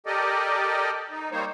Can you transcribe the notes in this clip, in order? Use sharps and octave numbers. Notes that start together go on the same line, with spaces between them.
G4 A4 A#4 D5 D#5
D#4
G3 A#3 D#4 C5 C#5